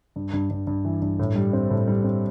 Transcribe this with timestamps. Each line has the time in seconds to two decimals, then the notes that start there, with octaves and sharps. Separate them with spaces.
0.16 G2
0.33 G2
0.50 G2
0.67 G2
0.85 E3
1.02 G2
1.20 A2
1.35 G3
1.53 C4
1.71 A2
1.88 G3
2.04 C4